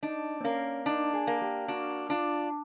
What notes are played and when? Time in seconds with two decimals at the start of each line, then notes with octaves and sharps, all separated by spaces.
0.03 D4 D#4
0.41 C4
0.44 A#3 C#4
0.86 D4 D#4
1.14 G#4
1.27 A#3
1.42 G4
1.68 D4 F#4
2.10 D4 F4